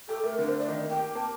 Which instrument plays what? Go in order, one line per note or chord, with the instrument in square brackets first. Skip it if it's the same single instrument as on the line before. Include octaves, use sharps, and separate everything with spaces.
[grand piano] G4 [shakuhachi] A4
[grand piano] A3 [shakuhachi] A#4
[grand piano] D3 [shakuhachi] A#4
[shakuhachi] C5
[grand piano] A3 [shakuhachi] D5
[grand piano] D#3 [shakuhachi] D#5
[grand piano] A#3
[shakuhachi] G5
[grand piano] G4
[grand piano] A#3 [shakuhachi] A5